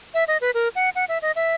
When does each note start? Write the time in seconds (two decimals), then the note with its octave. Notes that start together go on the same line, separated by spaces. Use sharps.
0.14 E5
0.28 D#5
0.41 B4
0.54 A#4
0.75 F#5
0.95 F#5
1.09 E5
1.22 D#5
1.36 E5